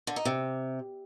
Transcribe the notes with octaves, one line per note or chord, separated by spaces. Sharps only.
D3
D#4
C3